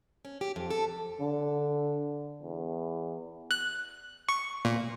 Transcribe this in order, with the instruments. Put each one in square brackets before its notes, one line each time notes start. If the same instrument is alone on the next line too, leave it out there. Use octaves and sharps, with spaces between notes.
[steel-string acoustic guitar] C#4
G4
F2
A4
[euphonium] D3
E2
[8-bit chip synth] F#6
C#6
A#2